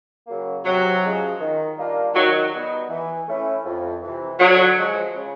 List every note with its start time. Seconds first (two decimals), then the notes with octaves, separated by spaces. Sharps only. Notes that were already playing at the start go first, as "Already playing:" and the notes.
0.27 C#3 F#3 A#3
0.65 C3 F#3
1.03 F3 G#3 C#4 F4
1.40 D#3
1.78 G3 A#3 D4 F4
2.14 D#3 F#3
2.52 G3 B3 D#4
2.89 E3
3.27 A3 C#4 E4
3.64 F2
4.02 C3 E3
4.39 D3 F#3
4.77 F3 G#3
5.15 C#3